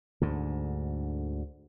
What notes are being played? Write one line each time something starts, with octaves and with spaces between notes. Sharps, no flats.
D2 G#2 D3